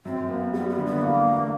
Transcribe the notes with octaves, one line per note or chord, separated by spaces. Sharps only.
F#2 C4
A#3 B3
G3 B3
B3
D3
B3
E2 A#3
A3